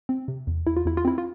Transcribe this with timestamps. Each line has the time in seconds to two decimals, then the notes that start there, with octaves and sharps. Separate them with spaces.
0.09 C4
0.28 C3
0.47 E2
0.67 E2 E4
0.77 F4
0.85 E2 E4
0.97 F4
1.05 C4 E4
1.18 F4